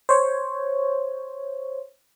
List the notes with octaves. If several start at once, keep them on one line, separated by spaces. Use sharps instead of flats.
C5 C#5